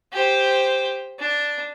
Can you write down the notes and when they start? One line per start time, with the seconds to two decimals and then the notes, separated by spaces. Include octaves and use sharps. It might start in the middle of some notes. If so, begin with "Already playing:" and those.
0.13 G4 C5
1.19 D4